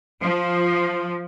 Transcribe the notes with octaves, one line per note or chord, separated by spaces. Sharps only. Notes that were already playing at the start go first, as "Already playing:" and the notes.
F3